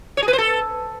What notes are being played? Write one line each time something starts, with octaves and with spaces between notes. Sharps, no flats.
C#5
G#4
B4
C5
A4